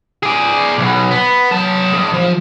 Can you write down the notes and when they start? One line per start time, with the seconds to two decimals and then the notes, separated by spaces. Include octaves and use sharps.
0.23 G#4 D5
0.78 B1 B2
1.11 B3
1.51 F#3 A5
1.93 D4 G#4
2.14 F3